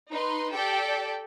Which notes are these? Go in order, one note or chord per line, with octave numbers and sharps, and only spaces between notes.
D#4 B4 C6
G4 A4 D5 G5